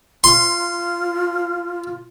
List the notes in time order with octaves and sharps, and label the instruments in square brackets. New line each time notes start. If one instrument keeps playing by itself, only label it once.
[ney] F4 [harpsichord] C6